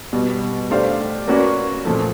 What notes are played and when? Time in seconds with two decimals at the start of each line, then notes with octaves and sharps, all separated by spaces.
0.13 B2 G3 B3
0.70 A3 D4 G4 C5 F5
1.28 A#3 C#4 F#4 B4 D5
1.85 A#2 F3 A3